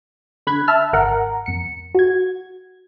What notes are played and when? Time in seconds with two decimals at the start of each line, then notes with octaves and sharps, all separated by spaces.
0.47 D3 B5 F#6 G#6
0.68 E5 A5 E6 F6
0.93 G#1 A#4 F#5 A#5
1.46 F2 C#7
1.95 F#4 G#6